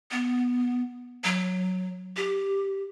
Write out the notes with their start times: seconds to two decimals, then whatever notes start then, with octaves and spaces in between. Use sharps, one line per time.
0.11 B3
1.24 F#3
2.17 G4